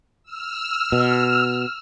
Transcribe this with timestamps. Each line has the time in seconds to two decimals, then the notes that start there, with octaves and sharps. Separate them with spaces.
0.23 E6 F6
0.92 B2